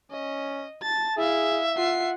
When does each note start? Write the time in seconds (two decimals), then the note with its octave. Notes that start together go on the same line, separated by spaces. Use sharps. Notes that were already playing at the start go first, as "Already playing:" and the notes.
0.11 C#4 D#5
0.83 A5 A6
1.17 E4 G#4 E5 F5
1.77 F4 F#5 C7